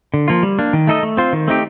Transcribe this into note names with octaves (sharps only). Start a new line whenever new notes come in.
D3
F3 A#3 F4
G3
A#3 D4
D#3
A3 D#4 A4 D#5
A3
C4 F4 C5
D#3
A3 C4 D#4 G4